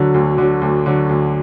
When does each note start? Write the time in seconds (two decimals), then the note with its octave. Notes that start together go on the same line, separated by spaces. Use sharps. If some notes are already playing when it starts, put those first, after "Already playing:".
Already playing: D2 D3 F#3
0.14 D2
0.38 D3 F#3
0.62 D2
0.86 D3 F#3
1.09 D2